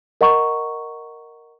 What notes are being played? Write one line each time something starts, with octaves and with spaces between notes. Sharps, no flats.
A#4 D#5 F#5 A#5 C#6